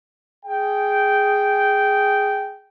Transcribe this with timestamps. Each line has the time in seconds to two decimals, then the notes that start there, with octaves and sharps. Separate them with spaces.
0.46 G#4 G5